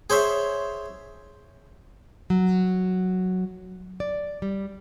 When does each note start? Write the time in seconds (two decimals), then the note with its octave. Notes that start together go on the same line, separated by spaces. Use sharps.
0.10 G#4 C5 C#5 E5
2.30 F#3
4.00 D5
4.42 G3